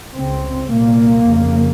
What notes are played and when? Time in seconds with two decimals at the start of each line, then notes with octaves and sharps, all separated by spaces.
0.15 C#2 C#3 C4
0.71 C2 A#2 A#3
1.28 F2 C#3